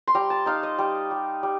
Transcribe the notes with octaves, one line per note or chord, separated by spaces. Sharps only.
C6
G3 A#5
A5
D#4 F5
D#5
G3
G3
G3